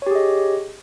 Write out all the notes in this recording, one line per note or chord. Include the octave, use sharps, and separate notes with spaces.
G4 G#4 C#5 D#5